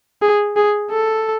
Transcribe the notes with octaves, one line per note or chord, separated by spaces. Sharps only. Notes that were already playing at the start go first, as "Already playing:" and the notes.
G#4
G#4
A4